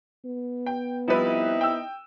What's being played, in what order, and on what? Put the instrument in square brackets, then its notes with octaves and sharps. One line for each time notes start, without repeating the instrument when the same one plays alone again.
[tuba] B3
[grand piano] G5
[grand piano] F3 G3 B4 [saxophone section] C4 D#4 E4
[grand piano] G5 E6